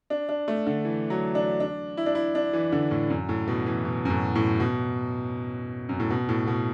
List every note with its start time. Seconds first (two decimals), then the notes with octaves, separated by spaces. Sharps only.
0.10 D4
0.29 D4
0.48 A3
0.66 D3
0.85 E3
1.10 F#3
1.35 D4
1.60 D4
1.97 E4
2.06 D4
2.15 E4
2.35 D4
2.53 E3
2.72 D3
2.91 A2
3.10 F#2
3.29 A2
3.48 B2
3.66 E3
3.85 B2
4.05 F#2
4.10 A2
4.35 A2
4.60 B2
5.89 F#2
6.00 A2
6.10 B2
6.29 A2
6.47 B2